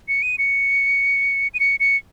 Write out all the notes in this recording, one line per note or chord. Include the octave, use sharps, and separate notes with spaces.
C#7
D#7
C#7
D#7
C#7
C#7